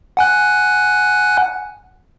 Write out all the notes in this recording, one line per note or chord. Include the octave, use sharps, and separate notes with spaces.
F#5 G#5 F#6